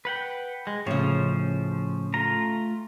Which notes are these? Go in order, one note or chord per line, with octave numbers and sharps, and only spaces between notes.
B4 F#5 G5
G#3
A2 C#3 F3 C#4 C5
A3 F4 A#5